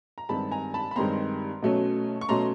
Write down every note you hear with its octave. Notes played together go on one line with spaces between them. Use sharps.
A#5
G2 D#3 G#3 C4 A5 B5
G#5 A#5
A5 B5
B5
G2 D#3 G#3 C4 A#5 C6
B2 F#3 A3 C#4
C#6
B2 F#3 A3 C#4 A#5 C6